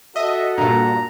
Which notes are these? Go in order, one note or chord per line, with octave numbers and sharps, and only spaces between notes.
F#4 A4 D#5 E5 F#5
G2 A#2 A#5